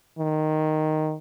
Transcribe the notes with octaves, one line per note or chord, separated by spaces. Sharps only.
D#3